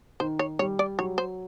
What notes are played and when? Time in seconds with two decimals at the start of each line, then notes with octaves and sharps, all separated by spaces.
0.20 D#3 C5
0.39 C#5
0.59 G3 C#5
0.79 D5
0.99 F#3 C#5
1.18 C5